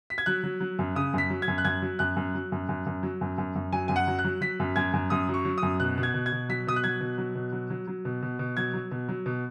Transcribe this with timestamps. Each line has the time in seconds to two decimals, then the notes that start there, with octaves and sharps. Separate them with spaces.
0.10 B6
0.18 G#6
0.26 F#3 F#6
0.44 F#3
0.61 F#3
0.79 F#2
0.95 C#3 D#6
1.14 F#2 B6
1.30 F#3
1.42 G#6
1.48 F#2
1.58 F#6
1.65 F#2 G#6
1.82 F#3
1.99 F#2 F#6
2.16 F#2
2.34 F#3
2.52 F#2
2.69 F#2
2.86 F#2
3.03 F#3
3.21 F#2
3.38 F#2
3.55 F#2
3.73 F#3 G#5
3.88 F#2 G#5
3.96 F#5
4.08 F#3
4.19 F#6
4.25 F#3
4.41 F#3 B6
4.60 F#2
4.76 F#2 G#6
4.93 F#2
5.10 F#2 D#6
5.29 F#3
5.34 C#6
5.45 F#3
5.58 D#6
5.63 F#2
5.80 B2 F#6
5.98 B2
6.03 G#6
6.14 B2
6.26 G#6
6.32 B2
6.49 F#3 B6
6.67 B2 D#6
6.76 F#6
6.84 F#3 G#6
7.01 B2
7.18 F#3
7.35 B2
7.52 F#3
7.70 F#3
7.88 F#3
8.05 B2
8.22 B2
8.39 B2
8.57 F#3 G#6
8.74 F#3
8.91 B2
9.09 F#3
9.26 B2